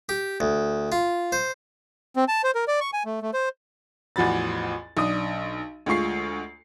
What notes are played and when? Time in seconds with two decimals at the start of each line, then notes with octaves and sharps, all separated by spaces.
0.09 G4
0.40 D2
0.92 F4
1.32 C5
2.16 C4
2.28 A5
2.44 C5
2.55 A#4
2.68 D5
2.81 C#6
2.93 G#5
3.05 A3
3.22 A3
3.34 C5
4.16 A1 E2 F3 F#4 B5 A6
4.97 B1 D4 D#6
5.86 D2 G#3 F4 C#6 C7